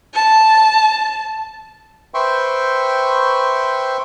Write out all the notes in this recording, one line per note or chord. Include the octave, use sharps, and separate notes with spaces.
A5
B4 C5 E5 G5 C6 C#6